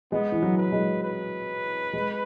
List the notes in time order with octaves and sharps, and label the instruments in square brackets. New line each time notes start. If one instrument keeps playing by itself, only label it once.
[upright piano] G#3 [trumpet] B3
[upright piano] E3
F#3
[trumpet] B4
[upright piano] G#3
[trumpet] B4
[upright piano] G#3